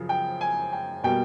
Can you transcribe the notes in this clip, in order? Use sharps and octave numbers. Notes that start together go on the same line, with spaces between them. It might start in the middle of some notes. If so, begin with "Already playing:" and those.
Already playing: F#2 C#3 F3
G5
G#5
G5
B2 G3 A#3 G5